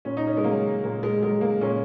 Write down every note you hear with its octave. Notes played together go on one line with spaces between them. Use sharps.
A#2 C#4
D#4
C#4
G#3
F#3 A#3
A#2 A#3
G#3
F#3 G#3
A#3
A#2 C#4